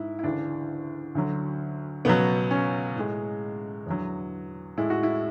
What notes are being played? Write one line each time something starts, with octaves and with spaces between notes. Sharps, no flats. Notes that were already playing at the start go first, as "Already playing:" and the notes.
Already playing: G#2 E4
E4
D2 C#3 E3 D4
D2 D3 F#3
C#2 B2 F#3 B3
C#4
A2 G#3
E2 D3 F#3
A2 G#3 E4
F#4
E4